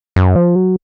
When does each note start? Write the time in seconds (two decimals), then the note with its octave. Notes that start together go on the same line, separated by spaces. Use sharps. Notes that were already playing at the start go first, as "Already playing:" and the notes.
0.16 F#2
0.36 F3
0.55 F#3